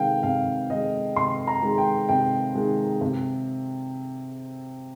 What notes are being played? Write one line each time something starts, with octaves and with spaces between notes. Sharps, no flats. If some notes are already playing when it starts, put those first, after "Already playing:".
Already playing: C3 D#3 G#3 F5 G5
C3 F5
D#3 G#3 D#5
C3 C6
A#5
D#3 G#3
G5
C3 G5
D#3 G#3
C3